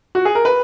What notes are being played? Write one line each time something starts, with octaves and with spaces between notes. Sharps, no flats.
F#4
G#4
A#4
B4